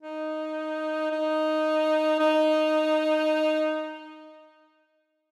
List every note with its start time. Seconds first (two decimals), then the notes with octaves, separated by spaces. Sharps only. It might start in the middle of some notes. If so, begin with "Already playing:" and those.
0.01 D#4
1.11 D#4
2.20 D#4